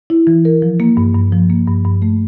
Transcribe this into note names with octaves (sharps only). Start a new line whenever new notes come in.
E4
E3
A#4
F3
A#3
G2
G2
F3
A#3
G2
G2
A3